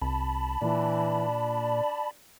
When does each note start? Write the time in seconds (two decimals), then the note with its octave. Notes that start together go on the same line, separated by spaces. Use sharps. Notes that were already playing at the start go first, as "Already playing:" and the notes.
0.01 C2 A5 B5
0.61 A#2 E3 D4
1.58 D5